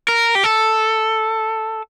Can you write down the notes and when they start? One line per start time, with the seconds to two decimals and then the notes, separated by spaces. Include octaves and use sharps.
0.08 A#4
0.35 G4
0.44 A4